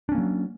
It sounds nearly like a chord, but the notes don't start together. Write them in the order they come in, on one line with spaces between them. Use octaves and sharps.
D4 C#4 A#3 F#3